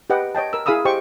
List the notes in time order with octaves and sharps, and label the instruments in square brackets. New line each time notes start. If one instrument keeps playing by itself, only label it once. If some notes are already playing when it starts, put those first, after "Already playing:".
[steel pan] G4 B4 D#5 F#5 G5
C#5 D#5 G5 A5
A#4 E6
E4 G#4 F5 B5 D#6 E6
G4 C5 D#5 G5 C#6